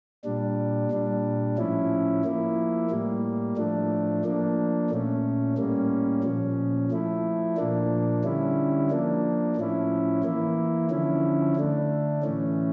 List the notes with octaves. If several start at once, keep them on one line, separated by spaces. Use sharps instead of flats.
A#2 G3 D4
A#2 G3 D4
A2 F3 C#4 E4
F3 A#3 E4
A2 G3 A#3
A2 F3 A3 D4
F3 A#3 D4
A#2 A3 C#4
A2 G3 A#3 C#4
A#2 F3 C#4
F3 A3 E4
A#2 F3 A#3 D4
D3 G3 C#4 E4
F3 A#3 D4
A2 F3 C#4 E4
E3 A#3 E4
D3 F3 C#4 E4
D3 A3 D4
A2 E3 A3 C#4